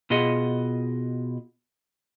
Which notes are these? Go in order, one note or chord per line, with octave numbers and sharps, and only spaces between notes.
B2 F4 G#4 D#5 F#5